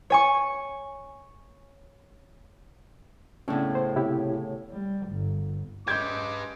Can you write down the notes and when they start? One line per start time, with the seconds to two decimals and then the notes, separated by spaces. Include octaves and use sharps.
0.10 C#5 G#5 C#6
3.48 A2 C#3 B3 C#4 D4 D5
3.75 C5
3.96 C3 E4 G4
4.71 G3
5.08 G1
5.88 G#3 C#4 G4 B4 D6 G6 G#6